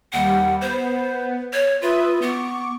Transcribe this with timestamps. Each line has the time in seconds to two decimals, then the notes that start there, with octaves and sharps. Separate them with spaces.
0.13 D#2 G3 F#5
0.61 B3 C5
1.53 C#5
1.82 F4 B4 E5 D#6
2.22 B3 C#6 D6